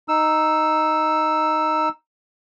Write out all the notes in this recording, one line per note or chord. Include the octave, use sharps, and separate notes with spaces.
D#4 E6